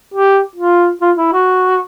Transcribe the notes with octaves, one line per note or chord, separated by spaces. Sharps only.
G4
F4
F4
E4
F#4